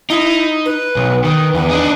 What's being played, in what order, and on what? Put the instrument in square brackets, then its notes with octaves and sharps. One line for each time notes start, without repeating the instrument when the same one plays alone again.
[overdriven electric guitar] D#4 [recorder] E4
[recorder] B4
[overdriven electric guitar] B1
[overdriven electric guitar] D#3 [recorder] B4
[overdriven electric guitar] E2 [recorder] B4
[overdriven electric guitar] D4 D#4